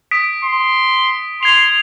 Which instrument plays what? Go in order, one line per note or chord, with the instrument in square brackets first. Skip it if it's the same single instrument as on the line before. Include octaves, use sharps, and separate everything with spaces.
[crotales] D#6 B6 D7
[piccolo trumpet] C6
[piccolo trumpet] C6 [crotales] G#6 C7 F7